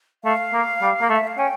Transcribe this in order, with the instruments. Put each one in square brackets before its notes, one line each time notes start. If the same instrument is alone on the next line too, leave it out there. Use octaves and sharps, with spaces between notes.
[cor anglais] A3 [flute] F5
[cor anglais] A#3
G3
A#3
A3
[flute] E5
F5
[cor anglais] C#4 [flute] G5